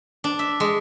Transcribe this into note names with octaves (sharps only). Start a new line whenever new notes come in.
D4
E5
G#3